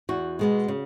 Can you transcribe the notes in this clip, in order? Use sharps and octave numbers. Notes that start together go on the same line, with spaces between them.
E2 F#4
B2 G#3 B3
C#3